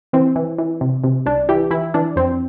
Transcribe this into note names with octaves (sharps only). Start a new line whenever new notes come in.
E3 C4
E3
E3
C3
C3
C2 D4
E3 G4
E3 E4
E3 D4
F2 C4